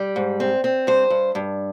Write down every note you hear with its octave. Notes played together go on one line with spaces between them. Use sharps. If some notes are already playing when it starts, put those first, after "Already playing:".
Already playing: G3
G#2
C4
C4
G2 C5
G2
G2